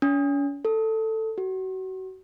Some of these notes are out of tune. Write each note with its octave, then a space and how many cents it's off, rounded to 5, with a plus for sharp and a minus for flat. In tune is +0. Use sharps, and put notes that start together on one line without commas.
C#4 +40
A4 +10
F#4 +30